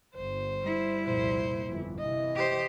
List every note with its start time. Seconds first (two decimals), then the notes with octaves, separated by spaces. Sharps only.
0.15 G1 C5
0.62 G3 E4
1.06 C2 F2 A#2 C5
1.67 G1 F2 E3
1.99 C3 E3 D#5
2.35 G4 C5